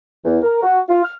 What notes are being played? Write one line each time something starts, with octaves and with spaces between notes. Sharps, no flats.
E2
A#4
F#4
F4
F6